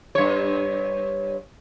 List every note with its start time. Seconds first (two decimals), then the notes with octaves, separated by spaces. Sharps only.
0.15 G2 C#5